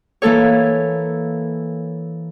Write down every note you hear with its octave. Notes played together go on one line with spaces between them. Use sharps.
E3 A#3 A4 C#5